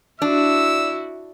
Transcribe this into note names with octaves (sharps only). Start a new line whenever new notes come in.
D4 E4 F#4 E6